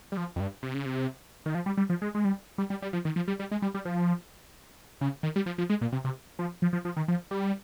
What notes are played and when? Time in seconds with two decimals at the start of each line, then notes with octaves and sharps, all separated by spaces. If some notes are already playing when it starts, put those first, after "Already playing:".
0.12 G3
0.17 F3
0.36 F2
0.40 G2
0.63 C3
0.74 C#3
0.86 C3
1.46 D#3
1.55 F3
1.66 G3
1.77 G3
1.90 F3
2.02 G#3
2.15 G#3
2.25 G3
2.58 G3
2.70 G3
2.82 G3
2.93 F3
3.05 D#3
3.16 F3
3.28 G3
3.39 G3
3.51 G#3
3.62 G3
3.74 G3
3.85 F3
5.01 C#3
5.23 D#3
5.36 G3
5.46 F3
5.58 F3
5.70 G#3
5.81 A#2
5.92 C3
6.05 C3
6.39 F3
6.62 F3
6.73 F3
6.85 F3
6.97 D#3
7.08 F3
7.31 G3